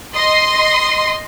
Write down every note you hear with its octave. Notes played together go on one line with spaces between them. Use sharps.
D#5 C6